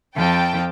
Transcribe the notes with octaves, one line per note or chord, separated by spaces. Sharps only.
F2 F3 G5 A5